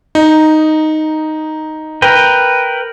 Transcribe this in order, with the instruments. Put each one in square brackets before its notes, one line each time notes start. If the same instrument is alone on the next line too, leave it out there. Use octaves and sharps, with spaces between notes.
[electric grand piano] D#4
[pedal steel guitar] A#4 B4 G5